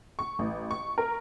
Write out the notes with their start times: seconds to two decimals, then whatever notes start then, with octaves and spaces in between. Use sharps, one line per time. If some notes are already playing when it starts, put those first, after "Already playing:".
0.19 C#6
0.39 A1
0.71 C#6
0.98 A#4